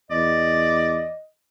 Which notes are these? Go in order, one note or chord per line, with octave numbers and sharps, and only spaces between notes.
E2 D5 D#5